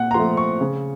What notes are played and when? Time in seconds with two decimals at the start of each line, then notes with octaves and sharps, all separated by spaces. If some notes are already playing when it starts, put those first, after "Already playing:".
Already playing: A#2 F#5
0.11 A#5
0.14 F3 A3 C6
0.37 C#6
0.61 C#3